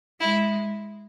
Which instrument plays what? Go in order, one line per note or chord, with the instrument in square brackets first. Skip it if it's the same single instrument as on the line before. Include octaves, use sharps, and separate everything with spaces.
[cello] G#3 [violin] E4